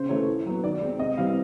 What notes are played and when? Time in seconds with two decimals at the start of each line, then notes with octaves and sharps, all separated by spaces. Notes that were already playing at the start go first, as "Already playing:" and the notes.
Already playing: C#3 C5
0.09 E3 A3 C#5
0.28 A2
0.46 F#3 B3
0.63 D#3 D5
0.81 G#3 C4
0.99 C3 D#5
1.17 E3 G3 C4 F5